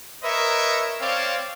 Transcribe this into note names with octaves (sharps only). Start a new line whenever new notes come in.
A#4 B4 C#5 D#5 E5
C4 C#5 D5 F5